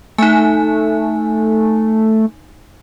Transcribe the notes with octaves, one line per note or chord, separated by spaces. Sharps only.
A3 D#4 G#5